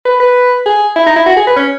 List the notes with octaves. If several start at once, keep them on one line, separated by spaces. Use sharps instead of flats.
B4
B4
G#4
E4
D#4
E4
F#4
G#4
B4
C#4